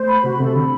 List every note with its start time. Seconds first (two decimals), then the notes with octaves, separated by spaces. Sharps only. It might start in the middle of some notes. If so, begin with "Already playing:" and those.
Already playing: A3 C5
0.08 B5
0.24 C3 F#4
0.40 C3 A4
0.56 D3 B5